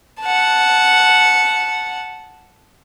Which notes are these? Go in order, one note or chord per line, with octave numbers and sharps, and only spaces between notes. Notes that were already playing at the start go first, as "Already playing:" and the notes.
F#5 A5